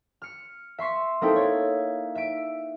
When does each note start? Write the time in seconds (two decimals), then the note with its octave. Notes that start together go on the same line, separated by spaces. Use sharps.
0.22 F6 C#7
0.78 E5 C6 C#6 B6
1.21 A#3 C4 D#4 E4 A4 G5
1.36 C#5 G#6
2.15 E5 B6 D7